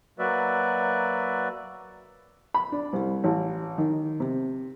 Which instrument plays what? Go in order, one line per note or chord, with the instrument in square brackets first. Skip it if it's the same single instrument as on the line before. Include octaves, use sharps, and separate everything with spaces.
[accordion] F#3 A#3 F#4 B4 D5 E5
[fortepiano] B5
D4
C2
A1
D#3
C3